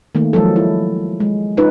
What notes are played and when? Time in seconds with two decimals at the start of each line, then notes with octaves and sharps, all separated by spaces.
0.15 D#3 A3 A#3
0.33 F3 F#3 G#3 A4
0.56 E4
1.20 G#3
1.57 C#4 D#4 F4 B4